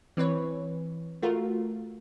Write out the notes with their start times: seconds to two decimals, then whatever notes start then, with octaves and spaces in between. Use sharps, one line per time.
0.17 E3 C4 B4 C#5
1.22 A3 F4 F#4 A#4